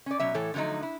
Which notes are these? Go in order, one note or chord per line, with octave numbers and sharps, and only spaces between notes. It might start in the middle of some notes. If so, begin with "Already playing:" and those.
C#4 D5
B2 F#3 C#4 E5
A2 E3 A4 C#5
D3 F3 F#3 A3 D#4
E4